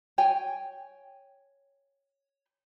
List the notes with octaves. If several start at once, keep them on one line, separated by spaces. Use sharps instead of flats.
C#5 G5 G#5